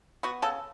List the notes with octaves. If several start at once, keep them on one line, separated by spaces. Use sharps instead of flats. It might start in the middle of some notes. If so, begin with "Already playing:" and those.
B3 F#4
C#3 A4